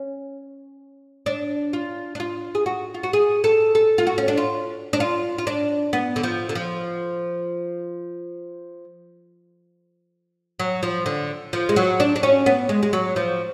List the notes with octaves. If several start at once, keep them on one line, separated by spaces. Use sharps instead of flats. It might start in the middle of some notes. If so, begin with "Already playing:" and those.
Already playing: C#4
D4
F4
D4
F4
G#4
F#4
F4
F#4
G#4
A4
A4
F4
F#4
C#4
D4
F4
D4
F4
F4
D4
B3
D3
F3
D3
F3
F#3
F3
D3
F3
G#3
F#3
D4
D4
C#4
B3
G#3
G#3
F#3
F3